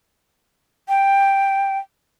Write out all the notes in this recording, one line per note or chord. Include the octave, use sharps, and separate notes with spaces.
G5